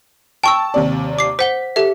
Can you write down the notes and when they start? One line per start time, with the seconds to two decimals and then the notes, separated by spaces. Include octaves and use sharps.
0.43 G5 A5 C#6 E6
0.74 D#2 C3 D5
1.19 D6 C7
1.39 C5 F#5 B6 G7
1.76 G4 A4 E5